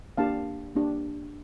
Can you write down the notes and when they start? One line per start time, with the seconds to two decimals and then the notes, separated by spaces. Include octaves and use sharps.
0.17 A#3 D4 G4 F5 A5
0.75 A#3 D4 G4